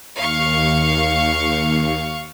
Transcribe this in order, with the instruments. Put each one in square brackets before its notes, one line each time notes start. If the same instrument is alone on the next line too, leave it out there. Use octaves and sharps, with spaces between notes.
[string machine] D#2 [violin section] F5 C#6